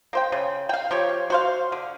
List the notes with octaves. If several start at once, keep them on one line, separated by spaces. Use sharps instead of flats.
A#3 C5 G5
C#3
F5 G5
F3 G4 C#5
F#4 C5 F5
D3